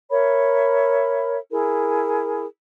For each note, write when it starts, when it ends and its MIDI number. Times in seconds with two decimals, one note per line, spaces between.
0.11 1.37 70
0.11 1.37 73
0.11 1.37 76
0.11 1.37 83
1.52 2.45 64
1.52 2.45 68
1.52 2.45 70